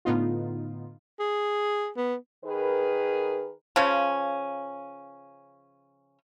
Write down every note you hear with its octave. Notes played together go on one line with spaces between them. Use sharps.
A2 D3 B3 D#4 F4
G#4
B3
D#3 G#4 A#4 B4
C#3 F3 C#4